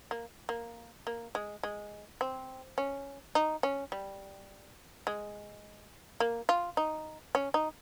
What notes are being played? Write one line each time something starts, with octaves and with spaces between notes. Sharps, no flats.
A#3
A#3
A#3
G#3
G#3
C4
C#4
D#4
C#4
G3
G#3
A#3
F4
D#4
C#4
D#4